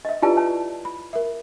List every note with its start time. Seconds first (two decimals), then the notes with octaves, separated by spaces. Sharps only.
0.05 D#5 E5
0.22 E4 F4 G4 B4 D5 A5
0.37 C#5 A5
0.85 B5
1.13 A#4 E5